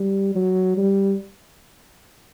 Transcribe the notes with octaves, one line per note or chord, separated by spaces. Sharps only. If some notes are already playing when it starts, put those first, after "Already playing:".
Already playing: G3
F#3
G3